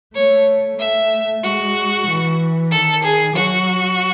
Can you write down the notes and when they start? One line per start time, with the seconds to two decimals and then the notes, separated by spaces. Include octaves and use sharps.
0.15 A3 C#5
0.79 A3 E5
1.43 G#3 F#4
2.08 E3
2.71 D#3 A4
3.04 G#4
3.35 F#3 F#4